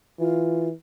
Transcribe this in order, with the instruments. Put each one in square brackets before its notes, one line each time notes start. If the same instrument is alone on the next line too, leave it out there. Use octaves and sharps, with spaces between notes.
[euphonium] E3 [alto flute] F4